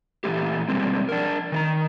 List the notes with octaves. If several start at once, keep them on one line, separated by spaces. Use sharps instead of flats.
A#2 E3 F3 A3 A#3 G4
B2 G3 G#3 A#3 C4
D4 A#4
D#3 D5 A#5